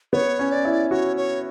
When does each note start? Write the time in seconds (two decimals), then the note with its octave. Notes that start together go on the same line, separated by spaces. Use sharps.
0.13 B3 C#5
0.39 C#4
0.52 D5
0.65 E4
0.91 F#4 C#5
1.17 C#5